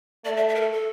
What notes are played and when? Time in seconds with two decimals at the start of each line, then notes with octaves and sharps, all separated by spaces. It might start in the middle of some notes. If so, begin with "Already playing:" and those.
0.25 A3 D5
0.37 E5
0.49 E5
0.55 A#4
0.61 A4
0.72 A4